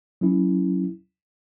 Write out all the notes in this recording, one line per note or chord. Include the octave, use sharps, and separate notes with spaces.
F#3 C#4 E4